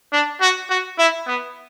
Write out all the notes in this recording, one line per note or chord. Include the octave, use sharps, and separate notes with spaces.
D4
F#4
F#4
E4
B3